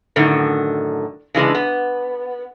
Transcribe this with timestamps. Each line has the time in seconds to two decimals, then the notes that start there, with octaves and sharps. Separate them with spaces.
0.16 F#2 A2 D3 D#3
1.35 C#3 E3 G#3 D4
1.55 B3